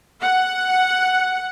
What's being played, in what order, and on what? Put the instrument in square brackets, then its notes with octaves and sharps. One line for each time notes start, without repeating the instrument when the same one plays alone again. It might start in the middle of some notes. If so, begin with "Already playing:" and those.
[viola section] F#5